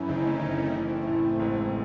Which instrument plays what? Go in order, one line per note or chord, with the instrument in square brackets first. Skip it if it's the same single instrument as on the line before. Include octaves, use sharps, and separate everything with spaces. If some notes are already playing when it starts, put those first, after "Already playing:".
Already playing: [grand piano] F#2 E3 [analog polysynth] C#4 E4
[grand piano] F#1 [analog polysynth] C4 D#4
[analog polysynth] A3 C#4
[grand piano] F#1 [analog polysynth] C4 D#4
[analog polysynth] A3 C#4
[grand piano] E3 [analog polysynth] A3
[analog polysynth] C4
A3
[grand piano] A2
[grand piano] A1 [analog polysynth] G#3 C4
[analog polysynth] A3